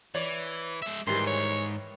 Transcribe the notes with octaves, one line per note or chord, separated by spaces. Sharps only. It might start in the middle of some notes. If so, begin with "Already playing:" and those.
E3 C#5 D5
G#3 E5
G#2 D#3 E3 G3 C6
C#5